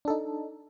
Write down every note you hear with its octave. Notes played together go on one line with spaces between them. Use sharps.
D4 D#4 A4